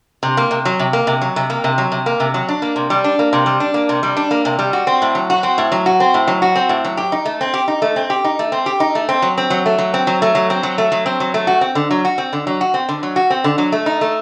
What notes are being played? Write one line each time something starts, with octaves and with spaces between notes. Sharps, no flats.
C3
A#3
C3
F#3
C3
A#3
C3
F#3
C3
A#3
C3
F#3
C3
A#3
C3
F#3
D4
A#3
C3
G3
D4
A#3
C3
G3
D4
A#3
C3
G3
D4
A#3
C3
G3
F#4
C4
A2
F#3
F#4
C4
A2
F#3
F#4
C4
A2
F#3
F#4
C4
A2
F#3
G4
D#4
A3
C4
G4
D#4
A3
C4
G4
D#4
A3
C4
G4
D#4
A3
C4
F#3
C4
F#3
A3
F#3
C4
F#3
A3
F#3
C4
F#3
A3
F#3
C4
F#3
A3
F#4
C4
D3
F#3
F#4
C4
D3
F#3
F#4
C4
D3
F#3
F#4
C4
D3
F#3
A3
D#4
A3